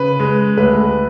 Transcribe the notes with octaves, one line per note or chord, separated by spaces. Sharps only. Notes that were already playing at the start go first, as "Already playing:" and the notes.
Already playing: C#3 B4
G#3
D2 B4